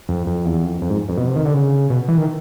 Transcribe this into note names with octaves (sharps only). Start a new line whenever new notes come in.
F2
F2
E2
F2
F2
G#2
F2
B2
C3
D#3
D3
C#3
B2
E3
D#3